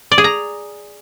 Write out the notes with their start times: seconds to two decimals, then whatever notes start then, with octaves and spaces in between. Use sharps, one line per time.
0.12 D5
0.18 G#4
0.24 A#5